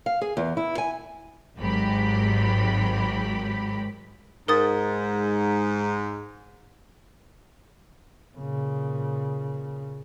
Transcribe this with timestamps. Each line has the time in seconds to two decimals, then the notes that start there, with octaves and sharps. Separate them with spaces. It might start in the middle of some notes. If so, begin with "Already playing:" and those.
0.06 F5
0.21 G#4
0.37 E2
0.57 E4
0.78 G#5
1.58 G#1 G#2 F#3 G4 B5
4.48 G#2 A#4 D#6 A6
8.36 A#2 C#3